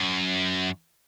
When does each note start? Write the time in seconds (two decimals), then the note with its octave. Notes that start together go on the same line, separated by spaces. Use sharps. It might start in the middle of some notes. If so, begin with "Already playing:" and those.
Already playing: F#2